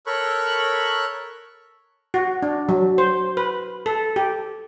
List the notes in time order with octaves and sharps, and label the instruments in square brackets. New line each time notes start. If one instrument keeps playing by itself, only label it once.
[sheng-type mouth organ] A4 A#4 C#5 B5 C#6 F#6
[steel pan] F#4
D4
F#3
C5
B4
A4
G4